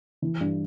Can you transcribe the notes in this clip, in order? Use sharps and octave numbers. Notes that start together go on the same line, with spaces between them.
E3
G2